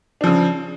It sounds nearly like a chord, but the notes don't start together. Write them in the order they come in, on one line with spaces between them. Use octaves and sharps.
D4 F3 C#3